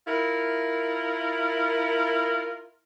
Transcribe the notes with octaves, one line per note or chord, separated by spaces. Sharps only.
E4 F4 A#4